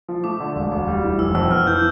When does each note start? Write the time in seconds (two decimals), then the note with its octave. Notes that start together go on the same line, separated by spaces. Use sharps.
0.08 F3
0.24 A3 D6
0.40 D3
0.56 E1
0.71 D2
0.88 G3
1.04 E3
1.19 F1 E6
1.35 F2 E6
1.51 B3 F6
1.67 E3 G6